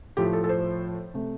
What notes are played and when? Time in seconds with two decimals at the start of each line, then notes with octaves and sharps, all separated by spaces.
0.17 A2 F3 A3 G4
0.33 A4
0.44 A4
0.49 C5
1.14 C3 A3